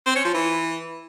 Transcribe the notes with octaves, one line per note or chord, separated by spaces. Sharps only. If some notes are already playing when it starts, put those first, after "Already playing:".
C4
C#4
F3
E3